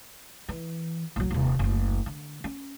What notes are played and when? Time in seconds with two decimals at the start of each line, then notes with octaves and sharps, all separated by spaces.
0.49 E3
1.16 A#1 F#3
1.30 D#1 C3
1.59 F#1 D2
2.06 D3
2.44 C#4